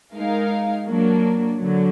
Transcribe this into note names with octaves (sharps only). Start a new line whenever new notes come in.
G#3 D#4 A#4 F5
F#3 A#3 D4
D3 F#3